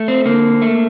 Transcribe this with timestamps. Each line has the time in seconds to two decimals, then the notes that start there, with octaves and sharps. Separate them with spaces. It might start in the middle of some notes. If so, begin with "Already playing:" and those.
Already playing: A3
0.08 C4
0.25 D3 A#3
0.62 A3